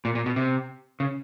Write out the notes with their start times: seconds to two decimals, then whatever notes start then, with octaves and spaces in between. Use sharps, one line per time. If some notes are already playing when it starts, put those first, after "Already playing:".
0.05 A#2
0.15 A#2
0.26 B2
0.36 C3
1.00 C#3